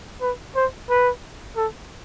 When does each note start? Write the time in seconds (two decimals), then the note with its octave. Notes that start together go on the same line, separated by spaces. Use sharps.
0.21 B4
0.56 C5
0.90 B4
1.57 A4